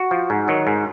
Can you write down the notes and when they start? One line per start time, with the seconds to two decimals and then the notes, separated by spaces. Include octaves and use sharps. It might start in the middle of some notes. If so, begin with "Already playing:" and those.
Already playing: F#4
0.11 F3
0.30 G#2
0.48 D#3 F#3
0.67 G#2